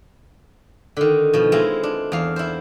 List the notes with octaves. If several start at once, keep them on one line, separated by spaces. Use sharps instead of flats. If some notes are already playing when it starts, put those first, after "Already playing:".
D3 D#3
B2 F3
G#3 C4 E4 F4
D4
E2 F5
E4 C5